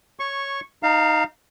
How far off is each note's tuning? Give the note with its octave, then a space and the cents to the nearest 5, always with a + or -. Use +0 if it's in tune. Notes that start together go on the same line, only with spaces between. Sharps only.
C#5 +0 C#6 -10
D#4 +0 F5 +0 A#5 -45